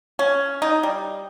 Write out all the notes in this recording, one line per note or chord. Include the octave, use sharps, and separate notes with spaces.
C#4
D#4
G3